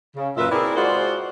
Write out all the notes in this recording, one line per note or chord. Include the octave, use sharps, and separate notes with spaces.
C#3
F#2 A#2 B4 E5
C4 E4 G#4 A#4 B4 D5
G#3 F4 F#4 C5 D5 F#5